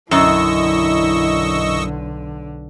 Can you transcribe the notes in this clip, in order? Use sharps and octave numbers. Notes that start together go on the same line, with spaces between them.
B1 F#2 D3 E4 D#5 C#6 E6